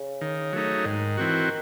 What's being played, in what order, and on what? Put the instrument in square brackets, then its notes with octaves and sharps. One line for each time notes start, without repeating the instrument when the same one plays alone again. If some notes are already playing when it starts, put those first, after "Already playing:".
Already playing: [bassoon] C#3
[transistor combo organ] D#3
F#3 A3 D#4
[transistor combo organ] G#2 [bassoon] D#3
[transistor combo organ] E3 C4 F#4